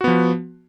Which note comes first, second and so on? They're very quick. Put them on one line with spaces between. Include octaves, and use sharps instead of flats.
F#4 B3 F3